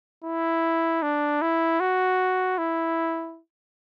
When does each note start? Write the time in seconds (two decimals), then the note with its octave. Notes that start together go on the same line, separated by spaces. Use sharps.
0.24 E4
1.03 D4
1.42 E4
1.80 F#4
2.58 E4